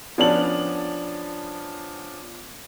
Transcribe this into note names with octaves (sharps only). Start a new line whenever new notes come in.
F3 B3 C#4 D4 A5 F#7